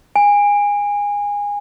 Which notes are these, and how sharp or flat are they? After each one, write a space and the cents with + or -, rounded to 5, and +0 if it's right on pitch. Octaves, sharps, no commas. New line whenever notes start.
G#5 -20